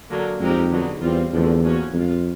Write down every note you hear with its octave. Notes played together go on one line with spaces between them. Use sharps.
D3 F#3 A#3
F2 G#3 C4 D#4 G4 A#4
D3 F#3 B3 D#4 G#4
E2 G3 C4 F4
E2 D3 F3 A3 C4
F3 A#3 C#4 F#4
F2 G#3 C4 F4